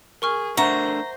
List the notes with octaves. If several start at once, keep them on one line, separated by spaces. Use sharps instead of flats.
G#4 A#4 C#6 F6
A3 D4 A#4 C5 E5 F#5 A#5 C#6